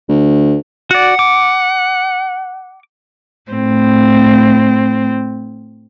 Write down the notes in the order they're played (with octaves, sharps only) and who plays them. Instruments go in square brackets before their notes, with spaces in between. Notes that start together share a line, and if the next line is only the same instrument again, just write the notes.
[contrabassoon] D2
[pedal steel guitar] F#4 D5 [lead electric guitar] F#5
[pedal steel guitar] D6
[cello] A2 C4